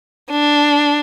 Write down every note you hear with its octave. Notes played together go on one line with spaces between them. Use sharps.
D4